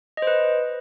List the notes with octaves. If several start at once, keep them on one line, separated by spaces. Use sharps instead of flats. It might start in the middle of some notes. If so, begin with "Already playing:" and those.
B4 C5 D#5